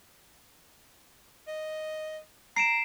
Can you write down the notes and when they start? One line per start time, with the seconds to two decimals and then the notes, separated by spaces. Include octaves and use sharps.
1.47 D#5
2.57 A#5 C7 D7 E7